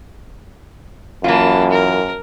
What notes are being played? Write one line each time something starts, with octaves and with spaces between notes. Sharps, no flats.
F#2 E3 A#3 F4 A5
A#4